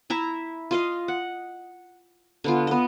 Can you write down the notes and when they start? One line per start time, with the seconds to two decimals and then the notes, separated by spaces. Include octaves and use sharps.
0.10 E4 E5 A#5
0.71 F4 D#5 F5
1.08 F#5
2.44 D3 B3 F4
2.67 B3 D#5